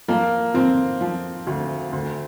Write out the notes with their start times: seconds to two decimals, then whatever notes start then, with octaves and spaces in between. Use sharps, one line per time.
0.08 F3 A#3
0.54 F3 C4
1.01 F3
1.47 D2
1.92 D2